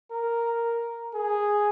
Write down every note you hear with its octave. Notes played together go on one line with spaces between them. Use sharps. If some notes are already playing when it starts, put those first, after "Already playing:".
A#4
G#4